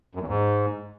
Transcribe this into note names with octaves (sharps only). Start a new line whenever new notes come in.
F#2
E2
G#2